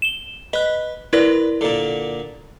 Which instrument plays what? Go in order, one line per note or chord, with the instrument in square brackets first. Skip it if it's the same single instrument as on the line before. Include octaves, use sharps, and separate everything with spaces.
[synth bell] E7 G7
[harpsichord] B4 [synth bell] D#5 F#6
[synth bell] E4 A#4 D5 [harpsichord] B4
[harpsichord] A#2 D3